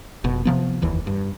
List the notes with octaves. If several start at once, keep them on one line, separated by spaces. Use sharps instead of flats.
F1 B2
C3 F3 B3
F1 D#2 E3
G2